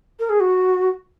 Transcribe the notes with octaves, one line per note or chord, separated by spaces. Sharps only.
A#4
G#4
F#4